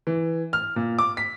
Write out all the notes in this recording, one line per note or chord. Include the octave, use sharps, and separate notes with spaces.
E3
F6
A#2
D6
B6